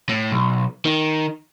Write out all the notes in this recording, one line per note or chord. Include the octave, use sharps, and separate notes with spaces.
A2
B1
D#3